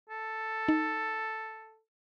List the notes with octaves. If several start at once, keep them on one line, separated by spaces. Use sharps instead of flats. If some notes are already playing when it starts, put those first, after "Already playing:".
A4
D#4